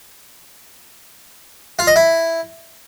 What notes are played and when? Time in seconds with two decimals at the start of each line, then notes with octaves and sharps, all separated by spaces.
1.79 F4
1.87 D#5
1.96 E4